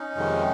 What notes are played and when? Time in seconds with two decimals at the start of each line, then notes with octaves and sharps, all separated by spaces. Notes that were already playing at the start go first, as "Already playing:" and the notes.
Already playing: C#4 D#4
0.15 F2 C3 D#3 G#3